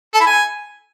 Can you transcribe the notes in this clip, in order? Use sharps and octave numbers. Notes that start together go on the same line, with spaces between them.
A4
E4
G#5